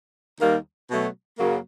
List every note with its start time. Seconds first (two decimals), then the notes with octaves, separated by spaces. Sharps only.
0.39 D#2 D#3 G3 A#3
0.89 B2 F#3 A3
1.39 F#2 C#3 F#3 A#3